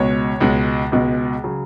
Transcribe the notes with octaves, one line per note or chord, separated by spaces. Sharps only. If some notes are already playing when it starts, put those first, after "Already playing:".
Already playing: C#2 B2 G#3 C#5
C#2 B2 G#3
C#2 B2 G#3
C#3 F#3